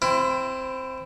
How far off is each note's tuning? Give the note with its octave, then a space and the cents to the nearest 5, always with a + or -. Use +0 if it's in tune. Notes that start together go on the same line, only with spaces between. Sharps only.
C4 +0 E4 +25